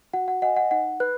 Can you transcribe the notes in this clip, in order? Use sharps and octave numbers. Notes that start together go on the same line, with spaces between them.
F#4 F#5
F#5
D#5 F#5 G#5
F#5
D#4 F#5
B4 F#6